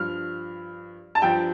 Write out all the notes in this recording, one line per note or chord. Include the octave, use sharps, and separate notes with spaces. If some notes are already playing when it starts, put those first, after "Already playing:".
Already playing: G2 F3 F6
A5
G2 F3 G5